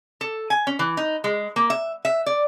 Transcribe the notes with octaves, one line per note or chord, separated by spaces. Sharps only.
A4
G#5
C#4
E3
D#4
G#3
A#3
E5
E5
D5